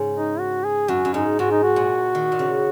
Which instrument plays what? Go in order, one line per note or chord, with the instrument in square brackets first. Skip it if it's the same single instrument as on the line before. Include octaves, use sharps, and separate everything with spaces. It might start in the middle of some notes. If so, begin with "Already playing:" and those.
Already playing: [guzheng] G#2 C#3
[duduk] D#4
F#4
G#4
[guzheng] F#2 [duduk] F#4
[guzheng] F#2
[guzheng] G#2 [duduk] D#4
[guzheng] G#2 [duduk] F#4
[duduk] D#4
F#4
[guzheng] A#2
D#3
A#2
C#3